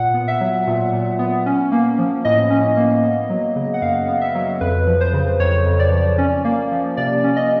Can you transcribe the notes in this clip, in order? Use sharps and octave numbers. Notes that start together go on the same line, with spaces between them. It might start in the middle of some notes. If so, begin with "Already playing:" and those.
Already playing: A#2 F#5
B3
E5
F#3
A#2
A#2
B3
C#4
A#3
F3
A2 D#5
C#4
A#3
B3
F#3
C#3
F#5
F#2 F5
B3
E5
F#3
F2 B4
F3
C5
C#3
F2 C#5
F2
D5
F3
C#4
A#3
F3
C3 D5
C#4
D#5